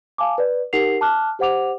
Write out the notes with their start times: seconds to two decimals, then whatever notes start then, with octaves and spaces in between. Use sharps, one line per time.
0.18 F5 G#5 A5 D6
0.38 B4 D5
0.73 D#4 G4 A#4 F#5 C7 F7
1.01 A5 D6 F6 F#6
1.39 G4 C5 F#5 D6 F7